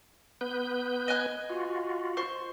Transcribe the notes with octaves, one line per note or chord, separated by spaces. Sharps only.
B3 B4 G6
D#5 G#5 F#6
F4 F#4
C5 C#6